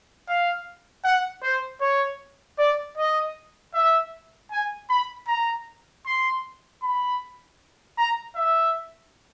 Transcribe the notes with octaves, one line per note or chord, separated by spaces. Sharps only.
F5
F#5
C5
C#5
D5
D#5
E5
G#5
B5
A#5
C6
B5
A#5
E5